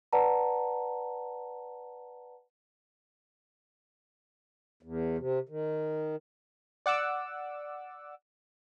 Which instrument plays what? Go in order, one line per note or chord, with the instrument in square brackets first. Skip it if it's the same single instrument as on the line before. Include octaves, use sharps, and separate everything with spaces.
[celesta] B4 D5 F#5 A5 A#5
[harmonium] E2
C3
D#3
[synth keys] D5 F#5 D6 E6